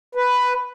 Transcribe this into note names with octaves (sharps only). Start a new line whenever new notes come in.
B4